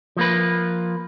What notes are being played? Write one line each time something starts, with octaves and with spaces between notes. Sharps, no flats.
F3 A#3 B4